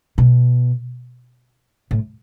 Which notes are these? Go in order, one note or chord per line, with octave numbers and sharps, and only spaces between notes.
B2
A2